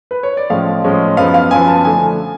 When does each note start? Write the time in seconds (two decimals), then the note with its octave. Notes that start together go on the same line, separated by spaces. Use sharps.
0.11 B4
0.23 C#5
0.37 D5
0.50 A2 F3 G#3 C#4 F5
0.84 A2 F3 G#3 C#4
1.17 F#2 F3 B3 F5
1.34 F5
1.51 F#2 F3 B3 G#5
1.68 A5
1.85 D3 F3 A3 D4 G#5